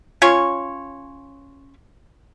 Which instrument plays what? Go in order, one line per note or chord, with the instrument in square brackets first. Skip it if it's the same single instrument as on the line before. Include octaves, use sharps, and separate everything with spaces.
[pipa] C#4 F4 C#5